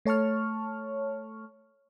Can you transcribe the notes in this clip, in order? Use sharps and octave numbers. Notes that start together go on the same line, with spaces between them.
A3 C#5 A5 C#6 F6